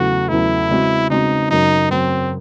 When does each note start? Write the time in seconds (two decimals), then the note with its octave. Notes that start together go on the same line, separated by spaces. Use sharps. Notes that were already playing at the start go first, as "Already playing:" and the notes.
Already playing: E2 C#3 F#3 A3 F#4
0.28 E2 C#3 F#3 A3 E4
0.69 C#3 G#3 C4 F#4
1.10 C#3 G#3 C4 D#4 F#4
1.51 F#2 C#3 F#3 D#4
1.91 F#2 C#3 F#3 C4